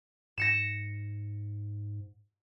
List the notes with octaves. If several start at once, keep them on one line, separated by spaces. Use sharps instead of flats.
G#2 A#6 C#7 E7